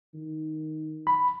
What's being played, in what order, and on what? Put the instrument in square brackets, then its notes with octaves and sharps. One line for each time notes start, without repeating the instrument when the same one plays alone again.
[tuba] D#3
[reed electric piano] B5